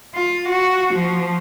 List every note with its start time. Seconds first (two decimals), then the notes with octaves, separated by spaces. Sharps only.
0.15 F4
0.49 F#4
0.94 F3